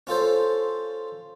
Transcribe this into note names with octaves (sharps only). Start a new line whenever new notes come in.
C#4 F4 A4 C5